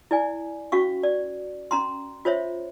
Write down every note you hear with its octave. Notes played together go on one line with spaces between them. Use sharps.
E4 D5 G#5
C#4 F#4 F5 C#6
D5
C#4 A#5 C6
F4 C5 C#5 E5